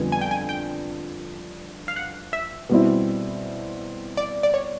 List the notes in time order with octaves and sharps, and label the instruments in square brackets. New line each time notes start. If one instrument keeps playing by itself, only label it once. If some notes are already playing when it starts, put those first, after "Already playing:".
Already playing: [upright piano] F2 D3 G3 B3 [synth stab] G#5
[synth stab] G#5
G5
G#5
G5
F5
F#5
E5
[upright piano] B2 G3 C4 E4
[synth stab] D5
D5
C#5